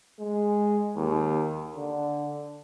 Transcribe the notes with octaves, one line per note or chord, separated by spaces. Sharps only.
G#3
D#2
D3